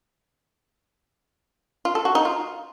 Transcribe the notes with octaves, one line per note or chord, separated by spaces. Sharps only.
F4
A4
F#4
D#4
F4